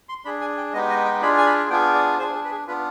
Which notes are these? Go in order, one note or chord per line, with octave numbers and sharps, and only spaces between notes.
C6
D4 G#4 B5
G#5
G5
G#3 B3 D#4 G4 D#5
D#5
G5
D4 F4 G#4 B5
G#5
B5
B3 D4 F4 G#4 G5
D5
D4 G#4 C5
G#4
B4
G#4
B3 D4 F4 B4